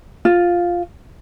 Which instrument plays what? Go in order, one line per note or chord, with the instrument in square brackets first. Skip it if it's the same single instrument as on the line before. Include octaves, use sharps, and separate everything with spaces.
[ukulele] F4